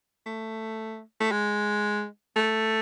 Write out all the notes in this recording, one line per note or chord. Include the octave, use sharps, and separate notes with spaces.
A3
A3
G#3
A3